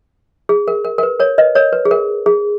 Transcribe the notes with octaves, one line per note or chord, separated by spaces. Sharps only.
G#4
A#4
A#4
A#4
B4
A#4 C#5
B4 D#5
A#4 C#5
B4
G#4
A#4
G#4